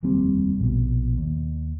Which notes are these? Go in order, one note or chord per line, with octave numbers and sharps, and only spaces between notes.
F1 D#2 G3 C4
A#1 B2
D#2